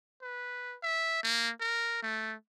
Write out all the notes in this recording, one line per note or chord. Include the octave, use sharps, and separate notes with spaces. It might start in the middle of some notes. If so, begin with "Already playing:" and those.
B4
E5
A#3
A#4
A3